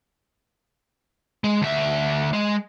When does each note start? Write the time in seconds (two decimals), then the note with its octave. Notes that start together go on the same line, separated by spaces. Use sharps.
1.44 G#3
1.62 D2 E5
2.33 G#3